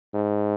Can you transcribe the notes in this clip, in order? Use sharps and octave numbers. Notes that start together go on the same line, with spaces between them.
G#2